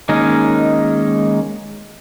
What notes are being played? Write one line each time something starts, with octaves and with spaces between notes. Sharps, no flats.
D#3 G#3 A#3 C#4 D#4